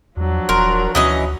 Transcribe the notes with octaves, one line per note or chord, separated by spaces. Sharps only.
E2 F3 F#3 D4
D#1 A#4 C6
D2 E3 C#4 F#4 D#5 D#6